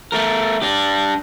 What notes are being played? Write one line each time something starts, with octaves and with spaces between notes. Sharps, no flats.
A3 A#4
D4 G4